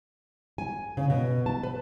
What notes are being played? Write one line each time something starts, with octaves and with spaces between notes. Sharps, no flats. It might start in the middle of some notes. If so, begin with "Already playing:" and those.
G#5
C#3
B2
A5
B4